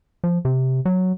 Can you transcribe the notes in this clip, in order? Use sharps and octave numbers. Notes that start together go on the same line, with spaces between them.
F3
C3
F#3